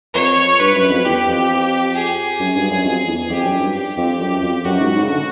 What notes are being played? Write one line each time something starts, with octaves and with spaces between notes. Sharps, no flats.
F2 C#5
G2 B4
F#2
F2
E2 G4
F2
G#4
F#2
G2
F#2
F2
E2
F2 G4
F#2
G2
G4
F2
F#2
F2
F#2 F#4
G#2
G#2
C#3
D3